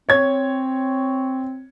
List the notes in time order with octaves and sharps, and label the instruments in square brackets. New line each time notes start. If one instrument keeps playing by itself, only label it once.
[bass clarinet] C4 [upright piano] C#5 G#6